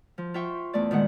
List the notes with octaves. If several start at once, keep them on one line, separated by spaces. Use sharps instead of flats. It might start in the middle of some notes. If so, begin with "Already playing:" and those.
F3
F4 E5 G5 C#6
E2 A3 D5
A#2 D#3 G#3 F#5